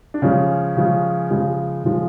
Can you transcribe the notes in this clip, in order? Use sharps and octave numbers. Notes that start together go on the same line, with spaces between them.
D4
C#3 F3 G#3 C#4
C#3 F3 G#3
C#3 F3 G#3
C#3 F3 G#3